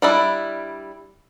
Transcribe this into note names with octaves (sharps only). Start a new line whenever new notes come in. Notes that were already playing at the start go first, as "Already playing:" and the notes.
G3 D4 E4